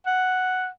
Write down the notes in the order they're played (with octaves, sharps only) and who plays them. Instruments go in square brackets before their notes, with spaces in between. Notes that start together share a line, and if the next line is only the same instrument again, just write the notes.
[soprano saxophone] F#5